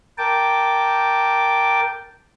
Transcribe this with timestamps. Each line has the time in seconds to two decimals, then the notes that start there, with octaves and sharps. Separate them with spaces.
0.18 A#4 G5 A5 D6